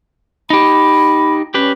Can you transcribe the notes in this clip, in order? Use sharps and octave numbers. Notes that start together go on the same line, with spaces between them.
D#4 G4 B5
C#4 G4 B4